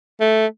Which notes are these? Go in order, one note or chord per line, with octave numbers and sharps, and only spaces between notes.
A3